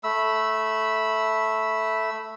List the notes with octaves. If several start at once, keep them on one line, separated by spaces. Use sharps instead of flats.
A3 B5 E6